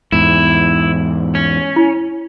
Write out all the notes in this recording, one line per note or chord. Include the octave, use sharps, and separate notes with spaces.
E2 G#2 E4
C#4
E4